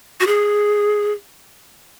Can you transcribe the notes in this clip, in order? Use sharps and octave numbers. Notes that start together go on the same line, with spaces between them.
F#4
G#4